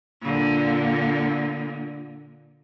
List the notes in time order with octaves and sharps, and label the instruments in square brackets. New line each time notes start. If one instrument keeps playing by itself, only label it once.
[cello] A#2 D3